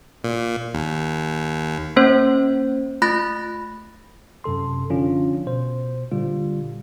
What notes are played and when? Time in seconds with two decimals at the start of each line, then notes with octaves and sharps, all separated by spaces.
0.24 A#2
0.74 D#2
1.96 A#3 C#4 C5
3.02 A3 F4 B5 F#6 A6 A#6
4.44 F#2 C3 A4 C6
4.90 D3 F3 C#4 D4 F4
5.47 B2 C5
6.11 A#2 D3 G3 F4